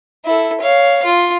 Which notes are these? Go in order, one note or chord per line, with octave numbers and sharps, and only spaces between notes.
E4 A4
C#5 F5
F4